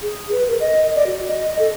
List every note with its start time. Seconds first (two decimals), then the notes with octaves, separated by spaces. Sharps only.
0.02 G#4
0.32 B4
0.48 A#4
0.60 D#5
0.95 D5
1.06 F#4
1.27 D#5
1.59 A4